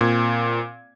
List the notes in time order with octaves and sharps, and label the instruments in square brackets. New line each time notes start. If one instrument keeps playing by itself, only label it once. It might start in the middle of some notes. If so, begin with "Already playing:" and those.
[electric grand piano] A#2 C4 G#6